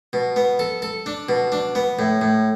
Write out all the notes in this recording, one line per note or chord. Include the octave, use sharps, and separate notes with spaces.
B2
B3
A4
A4
D4
B2
D4
B3
A2
A2